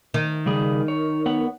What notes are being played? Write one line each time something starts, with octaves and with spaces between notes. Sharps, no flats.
D#3
C#3 G3 G#4
C#5
B3 C#5 F#5